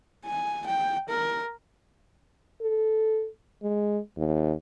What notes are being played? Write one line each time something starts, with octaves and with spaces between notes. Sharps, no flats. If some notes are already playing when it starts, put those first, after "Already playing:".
G#5
G5
A#4
A4
G#3
D#2